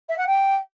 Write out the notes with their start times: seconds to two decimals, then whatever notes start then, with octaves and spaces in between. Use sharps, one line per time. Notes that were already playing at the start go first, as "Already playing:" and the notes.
0.09 E5
0.18 F#5
0.27 G5